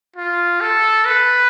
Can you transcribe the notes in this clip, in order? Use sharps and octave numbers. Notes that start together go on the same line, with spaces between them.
F4
A4
B4